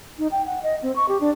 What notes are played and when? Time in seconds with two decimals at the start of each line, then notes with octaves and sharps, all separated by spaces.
0.19 D#4
0.32 G5
0.46 F#5
0.63 D#5
0.82 C4
0.96 C#6
1.08 G4
1.21 D4